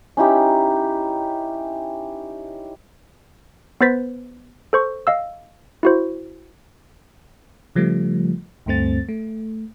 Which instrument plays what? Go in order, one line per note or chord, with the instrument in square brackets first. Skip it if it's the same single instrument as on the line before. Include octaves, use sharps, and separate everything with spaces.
[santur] C#4 D#4 E4 G4
[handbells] B3 B4 C5 A6 B6
A4 C5 C#6
D#5 F5 E6
E4 F#4 C5
[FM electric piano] C#3 F3 G3 A3
D2 G2 A3 C4 A6
A3